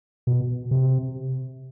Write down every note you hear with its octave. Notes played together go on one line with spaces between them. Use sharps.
B2
C3